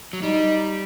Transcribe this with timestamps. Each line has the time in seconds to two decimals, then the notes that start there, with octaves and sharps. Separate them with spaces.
0.13 F#3
0.23 G3 D#4